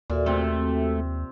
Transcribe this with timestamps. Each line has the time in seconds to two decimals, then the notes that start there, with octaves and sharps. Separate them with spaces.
0.10 D#2 A#2 F#4 A4 E5
0.26 C3 A3 C4